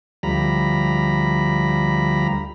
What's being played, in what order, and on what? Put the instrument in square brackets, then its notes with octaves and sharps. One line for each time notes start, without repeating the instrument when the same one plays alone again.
[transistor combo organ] D2 F3 G3 A#5 B5